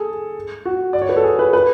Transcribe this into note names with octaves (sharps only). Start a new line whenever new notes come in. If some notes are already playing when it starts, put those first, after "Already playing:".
Already playing: G#4 A4
F#4
D5
C#5
B4
A4
G#4
B4
B4